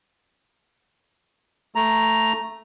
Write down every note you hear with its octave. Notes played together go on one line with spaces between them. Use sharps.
A3 A#5